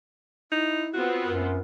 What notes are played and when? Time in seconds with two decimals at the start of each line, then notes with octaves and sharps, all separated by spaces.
0.52 D#4 E4
0.94 B3 C4 F4 F#4
1.24 F#2 A#4